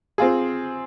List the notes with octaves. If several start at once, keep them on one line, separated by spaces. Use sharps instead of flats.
C4 F4 G#4